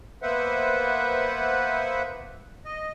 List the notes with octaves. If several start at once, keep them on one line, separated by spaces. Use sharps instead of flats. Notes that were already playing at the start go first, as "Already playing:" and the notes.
A#3 B3 B4 C5 E5 F#5
D#5